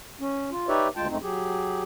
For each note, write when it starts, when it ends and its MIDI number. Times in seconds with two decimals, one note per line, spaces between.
0.20 0.50 61
0.51 0.68 65
0.68 0.88 63
0.68 0.88 67
0.68 0.88 71
0.68 0.88 73
0.68 0.88 74
0.68 0.88 76
0.96 1.07 38
0.96 1.07 56
0.96 1.07 65
0.96 1.07 79
0.96 1.07 81
1.09 1.17 42
1.09 1.17 56
1.09 1.17 57
1.09 1.17 60
1.09 1.17 63
1.22 1.83 54
1.22 1.83 67
1.22 1.83 68